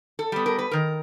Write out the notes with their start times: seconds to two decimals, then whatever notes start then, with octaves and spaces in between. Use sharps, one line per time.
0.19 A4
0.32 G3 B3
0.46 A#4
0.59 B4
0.71 D#3 A#4